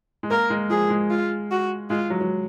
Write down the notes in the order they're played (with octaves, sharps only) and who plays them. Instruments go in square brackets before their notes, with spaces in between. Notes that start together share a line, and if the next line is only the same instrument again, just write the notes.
[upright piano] G#3
[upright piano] A#3 [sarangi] A#4
[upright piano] G#3
[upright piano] F3 [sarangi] G#4
[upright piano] G#3
[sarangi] F4
F#4
[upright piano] G#3 [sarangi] F4
[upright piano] F#3
F#3